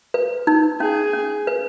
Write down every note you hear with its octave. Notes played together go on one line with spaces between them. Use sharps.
B4
D#4
C#4 G#4
C#4
B4